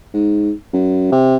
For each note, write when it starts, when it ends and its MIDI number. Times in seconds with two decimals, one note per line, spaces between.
0.14 0.51 44
0.73 1.08 42
1.12 1.36 48